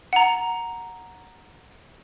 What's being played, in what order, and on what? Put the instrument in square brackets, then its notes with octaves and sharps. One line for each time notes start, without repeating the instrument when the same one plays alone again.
[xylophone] F#5 A#5